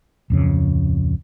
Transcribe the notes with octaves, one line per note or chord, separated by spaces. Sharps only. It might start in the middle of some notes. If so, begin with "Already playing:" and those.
D1 F2 C#3